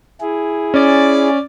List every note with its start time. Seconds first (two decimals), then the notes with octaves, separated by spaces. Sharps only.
0.21 E4 G#4
0.74 C#4 D5